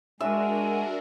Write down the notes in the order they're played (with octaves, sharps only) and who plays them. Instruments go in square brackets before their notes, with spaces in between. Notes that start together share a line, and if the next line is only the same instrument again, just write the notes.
[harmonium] G#3 [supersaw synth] D4 F#4 A#4 [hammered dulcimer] E5 [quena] G#5